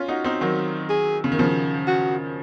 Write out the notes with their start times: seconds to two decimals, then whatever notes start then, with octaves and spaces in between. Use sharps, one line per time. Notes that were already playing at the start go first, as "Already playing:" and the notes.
Already playing: C#4 F4
0.08 D#4 F#4
0.24 C4 D#4
0.41 D#3 F#3
0.90 G#4
1.24 C#3
1.32 D#3
1.39 C#3 F3
1.87 F#4